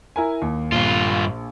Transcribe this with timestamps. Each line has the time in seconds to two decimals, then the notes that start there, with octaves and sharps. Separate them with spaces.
0.16 E4 A#4 G#5
0.42 D#2
0.72 A#1 G2 F4